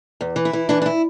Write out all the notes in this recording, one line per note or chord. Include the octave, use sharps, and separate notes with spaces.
E2
E3
E4
E3
E3 D4
D4
E4